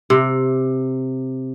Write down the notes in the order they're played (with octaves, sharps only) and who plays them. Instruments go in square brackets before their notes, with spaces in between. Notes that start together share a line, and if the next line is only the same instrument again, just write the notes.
[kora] C3